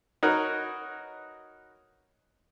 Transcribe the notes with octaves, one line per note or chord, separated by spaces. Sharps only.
D#4 F#4 A#4 B4 C#5